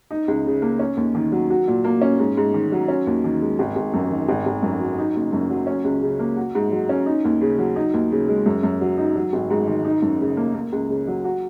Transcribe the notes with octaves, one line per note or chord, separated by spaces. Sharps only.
D#4
C#2
C#3
A#3
C#4
D#2
D#3
F#3
F#4
A#2
A#3
C#4
G#2
G#2
D#3
F#3
C#4
D#2
D#3
G#3
G#1
G#1
F#2
D#3
G#1
G#1
F#2
F#3
D#4
F#1
F#2
F#3
C#4
C#2
C#3
A#3
F#4
G#2
F#3
C#4
D#4
D#2
C#3
F#3
D#4
D#2
C#3
G#3
F#2
F#2
F#3
D#4
F#3
G#1
G#2
D#3
D#4
F#2
C#3
A#3
A#3
C#2
C#3
F#3
F#4